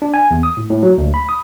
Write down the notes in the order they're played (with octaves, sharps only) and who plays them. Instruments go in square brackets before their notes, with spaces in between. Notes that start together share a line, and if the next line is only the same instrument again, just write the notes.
[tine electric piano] D4
G#5
E2
D#6
A2
A2
F#3
D2
B5
D#6